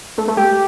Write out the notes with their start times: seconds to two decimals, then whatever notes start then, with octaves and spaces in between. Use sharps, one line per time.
0.18 A3
0.28 A3
0.37 G4